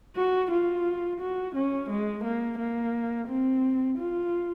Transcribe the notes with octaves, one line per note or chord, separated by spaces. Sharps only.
F#4
F4
F#4
C#4
G#3
A#3
A#3
C4
F4